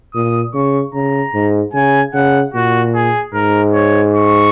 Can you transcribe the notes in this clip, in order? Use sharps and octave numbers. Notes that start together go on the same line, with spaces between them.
A#2 D#6
C#3 C#6
C#3 A#5
G#2
C#3 G#5
C#3 F#5
A#2 F#4
G#4
G#2 A#4
C#5
C#6